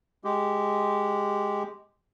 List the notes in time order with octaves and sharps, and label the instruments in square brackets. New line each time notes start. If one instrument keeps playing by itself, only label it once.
[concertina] G#3 G4